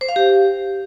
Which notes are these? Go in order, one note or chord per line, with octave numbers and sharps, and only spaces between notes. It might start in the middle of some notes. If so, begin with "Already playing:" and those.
C5
F5
G4